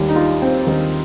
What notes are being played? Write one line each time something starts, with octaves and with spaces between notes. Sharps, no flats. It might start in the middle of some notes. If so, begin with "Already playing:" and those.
Already playing: D#2 D#3 G3
D#4
F4
C4
D#2 D#3 G3 D#4